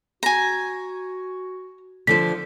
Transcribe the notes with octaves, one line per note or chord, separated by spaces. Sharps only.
F#4 G#5 A#5
D3 F3 C5 B6